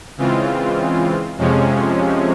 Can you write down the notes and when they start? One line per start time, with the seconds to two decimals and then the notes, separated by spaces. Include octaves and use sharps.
0.17 C#3 E3 G#3 C4 F4
1.37 F2 C3 F3 G#3 C#4